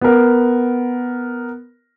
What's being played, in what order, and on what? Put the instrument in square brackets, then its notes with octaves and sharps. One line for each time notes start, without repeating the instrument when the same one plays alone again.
[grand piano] B3 A#4